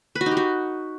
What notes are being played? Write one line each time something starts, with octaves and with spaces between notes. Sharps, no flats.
B4
F#4
D#4
G4
F#4